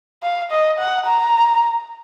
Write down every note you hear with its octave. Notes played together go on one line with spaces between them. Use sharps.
F5
D#5
F#5
A#5